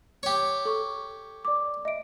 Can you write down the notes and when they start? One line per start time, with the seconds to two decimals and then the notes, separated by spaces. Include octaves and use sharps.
0.23 G4 C#5
0.65 A4 C#6
1.45 D5 D6
1.85 D#5 E5 D7